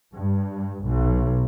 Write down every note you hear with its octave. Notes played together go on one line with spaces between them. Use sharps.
G2
B1